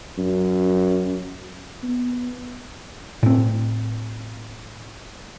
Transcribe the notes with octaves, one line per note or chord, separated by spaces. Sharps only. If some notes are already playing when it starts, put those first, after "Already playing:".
F#2
B3
A2 C4